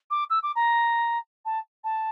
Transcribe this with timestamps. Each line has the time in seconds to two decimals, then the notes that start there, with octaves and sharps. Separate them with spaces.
0.11 D6
0.30 E6
0.43 D6
0.55 A#5
1.45 A5
1.84 A5